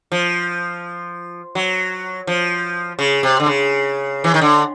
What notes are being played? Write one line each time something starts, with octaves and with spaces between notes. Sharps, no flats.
F3
F#3
F3
C#3
C3
D3
C#3
E3
D#3
D3